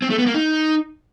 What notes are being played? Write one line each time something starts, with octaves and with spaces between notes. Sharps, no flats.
C4
A3
B3
A#3
D#4